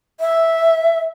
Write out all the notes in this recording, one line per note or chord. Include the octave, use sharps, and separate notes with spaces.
E5